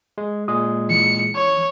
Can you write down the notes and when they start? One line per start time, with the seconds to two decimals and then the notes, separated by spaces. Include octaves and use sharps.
0.18 G#3
0.48 A#2 G#3 D#6
0.90 E3 C#7
1.35 C#5